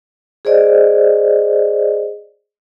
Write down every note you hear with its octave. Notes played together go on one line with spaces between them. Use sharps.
G#4 C5 D5 D#5